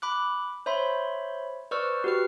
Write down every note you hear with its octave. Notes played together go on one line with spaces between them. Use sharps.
B5 D6 F#6
C5 C#5 E5 B5 C6
B4 C5 D5 C#6 E6 F6
F#4 G4 B4 F6